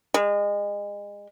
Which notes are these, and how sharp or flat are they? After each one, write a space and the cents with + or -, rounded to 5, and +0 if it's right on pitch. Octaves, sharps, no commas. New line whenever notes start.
G#3 -30